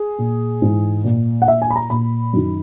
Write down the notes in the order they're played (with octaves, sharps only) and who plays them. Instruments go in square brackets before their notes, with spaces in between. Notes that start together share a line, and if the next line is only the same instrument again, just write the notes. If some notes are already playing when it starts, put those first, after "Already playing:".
Already playing: [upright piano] G#4
A#2
G#2 E3
A#2
F#5
A#2 E5
G#5
B5
A#5
A#2 B5
F#2 D#3